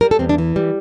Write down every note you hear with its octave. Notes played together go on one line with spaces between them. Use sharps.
G3 A#4
A4
E2 C4
D4
E3
G3